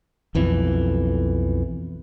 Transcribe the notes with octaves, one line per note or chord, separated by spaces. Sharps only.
B1 F2 E3